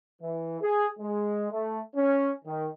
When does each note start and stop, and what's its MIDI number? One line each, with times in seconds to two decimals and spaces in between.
0.21 0.56 52
0.61 0.86 68
0.98 1.45 56
1.50 1.79 57
1.94 2.30 61
2.45 2.67 51